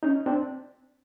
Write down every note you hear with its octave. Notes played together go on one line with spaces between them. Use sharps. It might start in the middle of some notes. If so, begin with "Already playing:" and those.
C#4 D#4
C4 D4